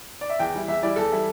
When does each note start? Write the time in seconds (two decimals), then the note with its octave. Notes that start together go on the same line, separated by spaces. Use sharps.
0.21 D5
0.30 E5
0.39 E2 G5
0.54 E3 G3 E4
0.68 E2 E5
0.83 E3 G3 E4 D5
0.96 E2 A4
1.12 E3 G3 E4